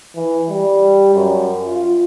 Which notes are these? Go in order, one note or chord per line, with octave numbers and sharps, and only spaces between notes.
E3
G3
F#2
F4